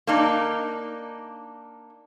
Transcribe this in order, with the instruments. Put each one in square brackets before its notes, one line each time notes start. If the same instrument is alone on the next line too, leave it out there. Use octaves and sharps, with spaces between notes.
[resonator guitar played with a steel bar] A#3 D4 D#4